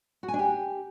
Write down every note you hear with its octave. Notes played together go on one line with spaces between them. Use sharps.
F#4
G#5
D4
G4